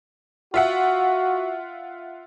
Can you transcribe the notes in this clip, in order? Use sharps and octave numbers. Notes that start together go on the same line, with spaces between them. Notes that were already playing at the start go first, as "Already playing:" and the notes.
F4 F#4 E5 F#5